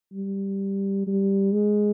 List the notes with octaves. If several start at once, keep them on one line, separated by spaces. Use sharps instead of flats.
G3
G3
G#3